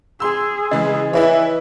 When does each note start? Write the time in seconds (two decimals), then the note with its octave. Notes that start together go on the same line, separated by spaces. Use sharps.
0.20 G#4 C6 E6
0.71 C#3 E3 G#3 D#5
1.13 E3 E4 B4 C#5